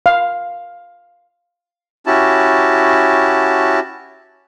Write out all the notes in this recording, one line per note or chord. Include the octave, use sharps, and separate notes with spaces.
F5
C#4 E4 F#4 G4 A5